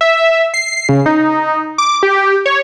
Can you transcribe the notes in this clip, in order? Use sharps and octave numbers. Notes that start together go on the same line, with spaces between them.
E5
C7
C#3
D#4
D6
G4
C#5